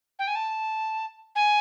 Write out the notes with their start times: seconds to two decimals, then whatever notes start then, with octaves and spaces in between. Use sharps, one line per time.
0.19 G5
0.28 G#5
0.35 A5
1.36 G#5